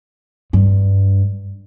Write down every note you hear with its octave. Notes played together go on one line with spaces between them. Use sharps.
G2